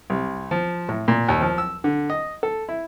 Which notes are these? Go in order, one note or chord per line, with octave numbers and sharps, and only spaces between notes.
C2
F3
A2
A#2
D#2
F3
E6
D3
D#5
A4
E4